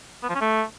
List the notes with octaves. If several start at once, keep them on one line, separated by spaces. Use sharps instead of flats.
B3
F3
C#4
A3